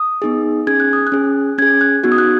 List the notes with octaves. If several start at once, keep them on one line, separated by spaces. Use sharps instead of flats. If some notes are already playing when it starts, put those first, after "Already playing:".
Already playing: D#6
B3 D#4 G#4
C#4 G#4 G#6
F#6
D#6
F#6
C#4 G#4
C#4 G#4 G#6
F#6
B3 D#4 F#4 G#6
D#6
F#6